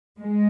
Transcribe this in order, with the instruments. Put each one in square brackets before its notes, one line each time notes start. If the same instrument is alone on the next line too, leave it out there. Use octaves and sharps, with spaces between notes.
[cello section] G#3